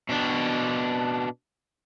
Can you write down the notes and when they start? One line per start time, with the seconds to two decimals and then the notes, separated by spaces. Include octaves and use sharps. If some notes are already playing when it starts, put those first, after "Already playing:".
0.09 B2 D4